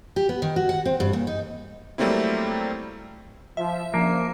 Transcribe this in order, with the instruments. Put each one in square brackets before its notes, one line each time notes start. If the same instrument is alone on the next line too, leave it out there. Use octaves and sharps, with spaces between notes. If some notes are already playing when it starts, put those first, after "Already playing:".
[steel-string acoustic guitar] G4
B3
D#3
F#4
F#5
C4
G2
A#2
D#4
[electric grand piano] F#3 G3 A3 A#3 C4 E4
[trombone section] F3 [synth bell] E5
[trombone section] F#2 C#3 D4 [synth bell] F3 [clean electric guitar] A#3